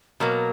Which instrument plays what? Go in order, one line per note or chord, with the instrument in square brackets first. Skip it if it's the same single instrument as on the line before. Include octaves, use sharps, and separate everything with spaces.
[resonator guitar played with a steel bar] B2 F#3 A#3 [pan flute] A#4